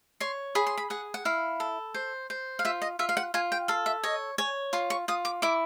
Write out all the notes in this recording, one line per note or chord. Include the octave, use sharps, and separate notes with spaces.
C#5 C6
G#4 B5
C6
B5
G#4 F#5
F#5
E4 F5
A4
C5
C5
F5
F4 E5
D#5
F4 E5
F5
F#5
F4 G#5
G5
A4 F5
E5
C#5 D#5
C#5 G#5
F4 C6
C#6
F4 D#6
D6
E4 D6